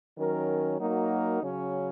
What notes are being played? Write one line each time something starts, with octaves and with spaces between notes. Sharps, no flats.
D#3 F#3 C#4 A#4
F#3 A#3 D#4 F#4 A#4
C#3 F#3 C#4